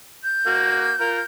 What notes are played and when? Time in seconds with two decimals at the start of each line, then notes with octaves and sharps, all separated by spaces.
0.23 G6
0.47 A#3 F#4
1.00 F4 A#4